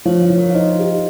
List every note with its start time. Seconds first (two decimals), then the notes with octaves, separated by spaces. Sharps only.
0.05 F3 C#5 F5
0.22 C#5 F5
0.30 F3
0.38 A#4 C#5
0.50 F5
0.55 D#4 C5 D#5
0.79 G4